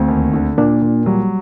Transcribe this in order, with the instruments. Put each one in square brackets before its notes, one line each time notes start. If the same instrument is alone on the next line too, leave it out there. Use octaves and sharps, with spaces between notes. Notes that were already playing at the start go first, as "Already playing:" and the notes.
Already playing: [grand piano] D2 [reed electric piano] A3 C4
[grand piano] D#2
D3
[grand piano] A#2 [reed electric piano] A#3 D4
[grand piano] A#2
[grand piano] F#3 [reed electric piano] G3